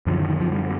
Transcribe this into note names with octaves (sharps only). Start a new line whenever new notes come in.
F#2 D3 F3
D#3
D#3
F3
G3